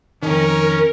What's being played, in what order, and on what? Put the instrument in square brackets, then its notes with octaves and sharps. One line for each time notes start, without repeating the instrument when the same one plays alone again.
[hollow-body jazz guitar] F2 D#3 [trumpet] C#4 [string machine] A#4